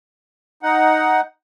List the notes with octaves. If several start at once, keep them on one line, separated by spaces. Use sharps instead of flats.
D#4 F#5